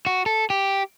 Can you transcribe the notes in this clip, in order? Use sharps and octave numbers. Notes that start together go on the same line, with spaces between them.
F#4
A4
G4